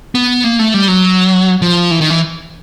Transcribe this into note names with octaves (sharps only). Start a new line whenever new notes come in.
B3
A#3
A3
G3
F#3
F3
E3
D#3
E3